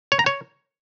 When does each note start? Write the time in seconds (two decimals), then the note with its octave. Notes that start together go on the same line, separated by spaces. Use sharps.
0.12 C#5
0.19 A#5
0.26 C#5